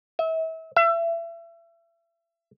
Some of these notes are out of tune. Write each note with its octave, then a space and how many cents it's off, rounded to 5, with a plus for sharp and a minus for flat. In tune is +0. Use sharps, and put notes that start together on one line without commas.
E5 -35
E5 +30